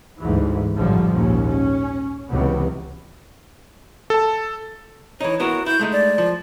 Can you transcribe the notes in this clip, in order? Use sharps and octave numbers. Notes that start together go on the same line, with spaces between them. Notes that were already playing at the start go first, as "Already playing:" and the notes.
G1 D2 G#2 E3
A1 F#2 D3 F3 G3
A#1 D#2 G#2 C#4
C#4
C#2 C3 E3 F#3 B3
A4 A5
E3 D#4 C#5
B3 E4 F#4 A#4
E4 G6
G#3 A3 D#4
D5
F3